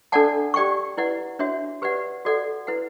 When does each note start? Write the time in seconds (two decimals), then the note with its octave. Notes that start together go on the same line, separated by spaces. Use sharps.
0.12 D4 A4 D5 F#5 A5
0.54 G4 D5 G5 C#6
0.97 E4 B4 D5 F#5
1.39 D4 F#4 C#5 E5
1.82 G4 B4 D5 F#5
2.25 F#4 A4 D5 F#5
2.67 E4 B4 F#5